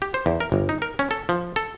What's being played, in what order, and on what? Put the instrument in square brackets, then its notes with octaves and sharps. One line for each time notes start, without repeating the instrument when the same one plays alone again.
[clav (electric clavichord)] G4
C5
E2
A#4
G1
D#4
A#4
C#4
A4
F3
A4